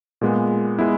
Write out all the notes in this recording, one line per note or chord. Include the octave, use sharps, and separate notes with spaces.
A#2 G#3 B3
G#3 B3 E4